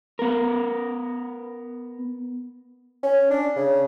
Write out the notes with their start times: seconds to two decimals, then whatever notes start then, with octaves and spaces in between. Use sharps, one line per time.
0.19 B3 A#4
3.03 C#4
3.30 D4
3.56 C#3